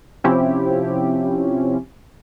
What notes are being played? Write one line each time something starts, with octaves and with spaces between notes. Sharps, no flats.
C3 F3 C4 C#4 E4 G4